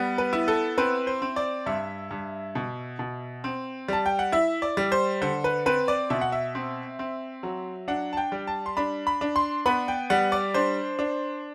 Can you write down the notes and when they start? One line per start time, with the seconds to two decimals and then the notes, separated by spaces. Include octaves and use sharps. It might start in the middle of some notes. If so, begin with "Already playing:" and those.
Already playing: G3 B3
0.18 B4
0.33 E4
0.48 A4
0.78 C4 B4
1.07 C5
1.22 C4
1.36 D5
1.66 G2 E5
2.11 G2
2.55 B2
2.99 B2
3.44 C4
3.88 G3 A5
4.06 G5
4.19 F#5
4.32 E4 E5
4.62 D5
4.77 G3
4.92 C5
5.22 D3 C5
5.44 B4
5.66 C4 B4
5.88 D5
6.10 B2 E5
6.21 F#5
6.32 E5
6.55 C4
6.99 C4
7.43 F#3
7.88 D4 F#5
8.13 A5
8.17 G5
8.32 G3
8.47 A5
8.66 C6
8.77 D4 B5
9.07 B5
9.21 D4
9.36 C6
9.66 B3 B5
9.88 G5
10.10 G3 F#5
10.32 D5
10.54 D4 C5
10.99 D4